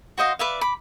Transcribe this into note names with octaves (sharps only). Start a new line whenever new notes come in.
F#4 C5 D#5 F5
B4 D5 E5 F5
B5 D6